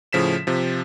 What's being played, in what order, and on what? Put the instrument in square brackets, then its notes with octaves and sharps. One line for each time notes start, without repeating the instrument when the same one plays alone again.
[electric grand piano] A2 C#3 F3 B6 E7
C3 F3